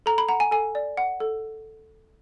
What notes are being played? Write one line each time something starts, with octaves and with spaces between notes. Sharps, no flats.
A4 A#5
B5
F#5 A#5
G#5
A4 G#5
D5
F#5
A4